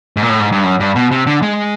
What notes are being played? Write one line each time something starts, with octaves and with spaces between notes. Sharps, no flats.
G#2
A#2
A2
G#2
G2
F#2
G2
B2
C3
D3
G#3